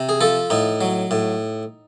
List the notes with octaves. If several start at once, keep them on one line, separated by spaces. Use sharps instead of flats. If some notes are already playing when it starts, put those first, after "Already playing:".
Already playing: C3
G#4
F3 A4
A2 D#4
F#3
A2